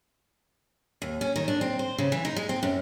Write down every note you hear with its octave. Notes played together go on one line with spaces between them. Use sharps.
D#2
C#4
D#3
D4
C4
C5
C#3
E3
D#4
G#3
C4
F#2